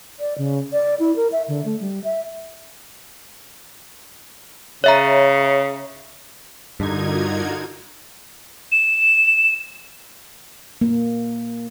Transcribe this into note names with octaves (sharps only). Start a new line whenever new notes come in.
D5
C#3
D5
E4
A#4
E5
D3
A3
G3
E5
C#3 C#5 E5 A#5
G2 D3 D#4 F4 F#4 A#4 G#6
E7
A#3